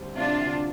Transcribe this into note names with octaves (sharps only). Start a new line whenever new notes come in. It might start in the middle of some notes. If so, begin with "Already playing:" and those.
Already playing: D2 G3 C4
C3 D4 F4
D2